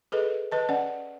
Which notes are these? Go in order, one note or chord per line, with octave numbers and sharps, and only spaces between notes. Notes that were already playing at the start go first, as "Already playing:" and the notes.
G#4 A4 B4 D#5
B4 D#5 A5
C#4 D5 F#5